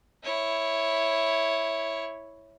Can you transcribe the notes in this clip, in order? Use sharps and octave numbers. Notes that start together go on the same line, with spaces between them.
E4 C#5